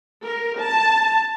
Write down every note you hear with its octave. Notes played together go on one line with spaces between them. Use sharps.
A#4
A5